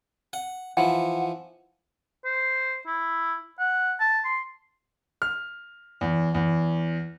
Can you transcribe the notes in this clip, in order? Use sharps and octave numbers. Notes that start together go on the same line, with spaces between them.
F#5
E3 F3 F#5
C5
E4
F#5
A5
C6
F6
E2
E2